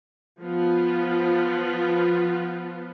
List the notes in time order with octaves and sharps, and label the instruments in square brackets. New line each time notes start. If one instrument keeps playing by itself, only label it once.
[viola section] F3 B3 F4